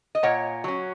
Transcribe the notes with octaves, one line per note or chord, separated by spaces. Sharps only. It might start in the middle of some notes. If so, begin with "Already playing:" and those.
D#5
A#2 C#5 F#5
F#3 C#4